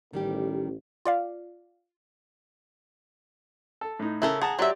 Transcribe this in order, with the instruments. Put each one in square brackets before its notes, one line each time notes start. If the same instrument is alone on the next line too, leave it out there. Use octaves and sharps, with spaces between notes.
[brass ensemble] A1 [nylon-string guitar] D#3 G3 G4
[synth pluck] F4 D5 F5
[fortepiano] A4
A2 D#4
[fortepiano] C#3 [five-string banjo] E4 A4 A#4
[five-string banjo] G#4 [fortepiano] F#5 A5 A#5
[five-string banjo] F#3 E5 [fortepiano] G4 D5 C6